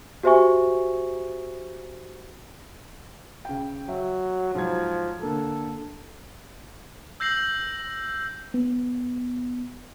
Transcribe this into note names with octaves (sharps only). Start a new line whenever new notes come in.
F#4 G4 C5 E5 G#5 C#6
C#3 G5
F#3 E5
G#2 F3 F#3 G#6
D3 A#3 A4
E6 G6 A#6 C7 F#7
B3